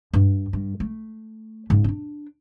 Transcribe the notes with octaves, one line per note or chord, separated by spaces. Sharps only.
G2
G2
A3
G#2 C#3
C#4 D4